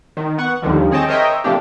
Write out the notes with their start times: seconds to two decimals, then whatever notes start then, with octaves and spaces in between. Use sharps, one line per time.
0.17 D#3
0.38 B3 F#5 C#6
0.62 D#2 D3 D#3 F3 G3
0.91 C4 G#4 C#5 D#5 G5 A5
1.08 A#4 C5 C#5 D#5 E5 G5
1.44 C3 F3 A3 A#3 D4 G4